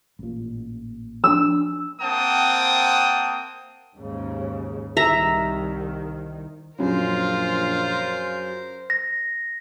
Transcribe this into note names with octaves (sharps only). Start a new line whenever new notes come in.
A1 A#2
F3 D4 E6
A#3 C4 F#5 G5 A5 D#6
D#2 G#2 C#3
C2 D#3 E5 A#5
A#1 F#2 C#3 F4 A#4 C5
A#6